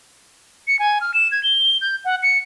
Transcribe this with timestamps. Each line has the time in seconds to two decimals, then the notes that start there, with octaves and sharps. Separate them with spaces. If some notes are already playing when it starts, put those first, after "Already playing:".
0.68 C#7
0.79 G#5
1.01 F6
1.14 E7
1.32 G#6
1.43 G7
1.81 G6
2.05 F#5
2.23 C#7